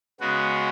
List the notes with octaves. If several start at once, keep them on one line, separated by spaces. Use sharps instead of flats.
C#3 G#3 B3 F#4